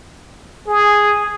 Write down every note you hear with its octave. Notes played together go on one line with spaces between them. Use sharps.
G#4